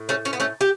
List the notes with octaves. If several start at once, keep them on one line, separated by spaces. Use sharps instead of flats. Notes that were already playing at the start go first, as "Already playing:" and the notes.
Already playing: A2
A3 C#4
C#4
B3
A3 C#4
G4